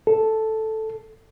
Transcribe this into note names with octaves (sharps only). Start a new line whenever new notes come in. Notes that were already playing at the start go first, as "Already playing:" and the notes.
A4